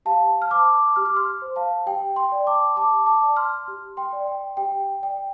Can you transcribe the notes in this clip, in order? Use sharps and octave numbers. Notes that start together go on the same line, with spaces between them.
G4 F5 A5
F6
C5 A5 D6
G4 F6
D6
C6 F6
C5
F5 A5
G4 G5
G5 C6
D5
A5 D6
G4 A5 D6
A5 D6
D5
C6 F6
G4
G5 C6
D5
G5
G4 G5
D5 G5